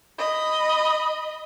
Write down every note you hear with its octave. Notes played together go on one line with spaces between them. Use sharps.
D#5 B5